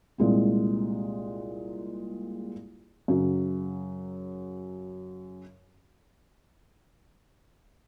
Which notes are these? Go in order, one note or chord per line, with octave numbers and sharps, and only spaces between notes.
C2 A#2 G#3 C4
F#2 C#3 F#3